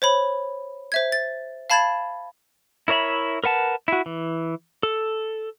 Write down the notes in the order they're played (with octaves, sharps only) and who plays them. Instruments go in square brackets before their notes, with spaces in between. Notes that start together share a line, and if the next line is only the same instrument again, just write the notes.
[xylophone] C5 C#5 B5
C5 E5 G#6
A6
F5 A5 B5 G#6 A6 E7
[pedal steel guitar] E4 A#4 C#5 E5 B5
A#4 B4 F#5 A5
E4 F#4
E3
A4